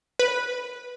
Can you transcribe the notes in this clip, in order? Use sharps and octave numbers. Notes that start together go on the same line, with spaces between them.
B4